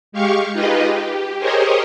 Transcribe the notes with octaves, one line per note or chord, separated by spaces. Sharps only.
G#3 G4 F5 C#6
D#4 F4 G4 G#4 B4 D#5
G4
G4 G#4 A#4 C5 C#5 D#5